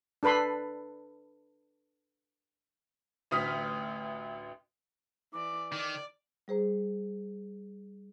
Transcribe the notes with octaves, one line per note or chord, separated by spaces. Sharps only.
D4 A4 B4 B5 C6
A1 D2 D#6 F6 B6
E3 D5 D6
D#3 D5
G3 G#4 C5 A#5